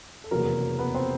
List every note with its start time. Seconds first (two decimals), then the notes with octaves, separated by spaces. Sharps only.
0.24 A4
0.31 F1 E2 C#3 F#3 A#3 A#4
0.79 B3 B4
0.95 C4 C5